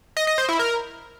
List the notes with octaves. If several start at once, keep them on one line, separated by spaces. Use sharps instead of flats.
D#5
D#5
C5
E4
A#4